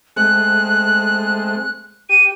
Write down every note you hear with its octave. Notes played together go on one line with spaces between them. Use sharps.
G#3 A3 C4 F#6
G4 D#7